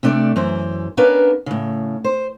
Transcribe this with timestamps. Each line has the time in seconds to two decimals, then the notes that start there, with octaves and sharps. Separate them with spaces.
0.03 C3 A3 D4 C#5 D5
0.36 F#2 E3 C5
0.97 B3 C#4 D4 A#4 B4 F5
1.46 A2 C#3
2.04 C5